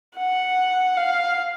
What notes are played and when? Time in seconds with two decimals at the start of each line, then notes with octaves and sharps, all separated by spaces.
0.17 F#5
0.97 F5